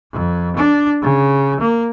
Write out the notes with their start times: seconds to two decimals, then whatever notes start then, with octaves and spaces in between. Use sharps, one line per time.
0.12 F2
0.56 D4
1.02 C#3
1.60 A#3